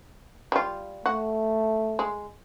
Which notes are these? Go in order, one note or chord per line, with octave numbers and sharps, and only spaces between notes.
G3 F4
A3 F#4
G#3